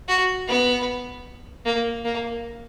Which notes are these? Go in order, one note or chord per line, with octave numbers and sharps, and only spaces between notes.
F#4
B3
A#3
A#3